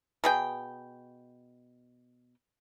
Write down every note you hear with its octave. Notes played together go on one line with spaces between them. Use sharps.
B2 G#4 G5